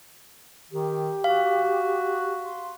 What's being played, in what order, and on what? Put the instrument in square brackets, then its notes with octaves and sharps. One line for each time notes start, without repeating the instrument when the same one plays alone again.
[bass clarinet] D#3 [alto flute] G4
[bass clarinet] F#4 [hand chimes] F5
[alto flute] C6